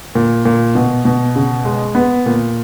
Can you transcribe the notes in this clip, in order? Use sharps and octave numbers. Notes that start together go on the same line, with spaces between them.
A#2
A#2
B2
B2
C#3
G#3
B3
A#2